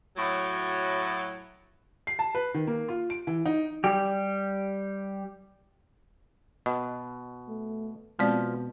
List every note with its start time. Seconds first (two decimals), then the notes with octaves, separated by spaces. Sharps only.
0.16 A2 F#3
2.07 C7
2.19 A5
2.35 B4
2.54 D#3
2.67 A#3
2.89 F4
3.10 D7
3.27 E3
3.46 D#4
3.84 G3 G4
6.66 B2 D#5
7.48 A3
8.19 B2 F3 G#3 C4 D5